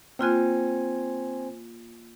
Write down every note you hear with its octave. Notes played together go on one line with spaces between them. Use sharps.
A#3 C4 F4 C5 G#5 F#6